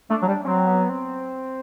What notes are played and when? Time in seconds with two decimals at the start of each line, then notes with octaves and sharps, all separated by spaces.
0.10 A3 D4
0.22 F#3
0.28 G3
0.45 F#3 C4
0.67 B3
0.89 C4